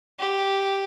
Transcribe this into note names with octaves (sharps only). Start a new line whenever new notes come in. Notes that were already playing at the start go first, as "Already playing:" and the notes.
G4